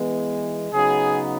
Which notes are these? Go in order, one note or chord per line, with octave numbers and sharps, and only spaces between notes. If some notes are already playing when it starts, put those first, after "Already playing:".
Already playing: E3 G#3 B3
C#3 F#3 B3 D#4 G#4